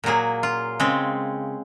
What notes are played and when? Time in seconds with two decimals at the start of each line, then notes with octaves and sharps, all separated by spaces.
0.04 A#2 F#3 A#3 G#4
0.43 F4
0.80 C#3 G#3 C4